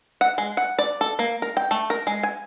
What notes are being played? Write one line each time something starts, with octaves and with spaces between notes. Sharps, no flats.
F#5
G#3
F#5
D5
A4
A#3
A#4
G5
A3
A#4
G#3
G#5